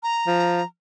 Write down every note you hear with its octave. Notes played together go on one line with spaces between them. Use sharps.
A#5
F3